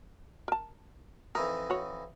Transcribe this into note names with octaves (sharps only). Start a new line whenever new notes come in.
A#4 A5
F2 E3 D#4 A#4
F#4 C#5